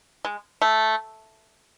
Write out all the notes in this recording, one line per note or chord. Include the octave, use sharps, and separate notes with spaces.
G#3
A3